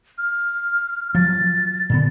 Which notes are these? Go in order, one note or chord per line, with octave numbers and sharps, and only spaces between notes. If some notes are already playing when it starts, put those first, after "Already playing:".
F6
F3 F#3 A6
A#2 D3 B3